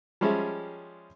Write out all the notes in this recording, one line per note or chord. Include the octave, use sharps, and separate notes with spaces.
F3 G3 G#3 C#4 G#4 E5